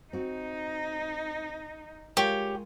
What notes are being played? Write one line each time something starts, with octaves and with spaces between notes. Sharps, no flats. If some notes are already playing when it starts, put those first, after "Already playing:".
C4 D#4 F#4
G#3 F4 G4 A#4 C#5